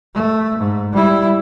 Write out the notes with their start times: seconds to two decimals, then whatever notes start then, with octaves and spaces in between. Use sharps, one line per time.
0.15 A3
0.59 G#2
0.93 G3 E4